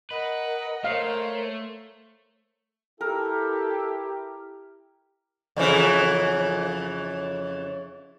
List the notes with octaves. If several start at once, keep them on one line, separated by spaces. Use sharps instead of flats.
A#4 B4 D#5 F#5
A3 A#4 C5 C#5 F5
E4 G4 A4 A#4
F2 C#3 E3